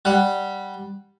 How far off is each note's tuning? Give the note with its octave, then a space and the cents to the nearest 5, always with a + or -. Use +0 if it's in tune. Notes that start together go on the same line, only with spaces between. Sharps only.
G3 +0 F#5 +0